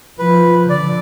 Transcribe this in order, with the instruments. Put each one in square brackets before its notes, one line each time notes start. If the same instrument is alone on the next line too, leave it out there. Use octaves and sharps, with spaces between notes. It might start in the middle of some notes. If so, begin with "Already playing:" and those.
[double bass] F3 [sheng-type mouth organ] B4
[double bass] D3 [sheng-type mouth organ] D5